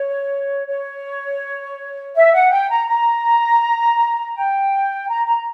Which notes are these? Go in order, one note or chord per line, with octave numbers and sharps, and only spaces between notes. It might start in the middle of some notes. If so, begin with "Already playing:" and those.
Already playing: C#5
C#5
E5
F#5
G5
A#5
A#5
G5
A#5
A#5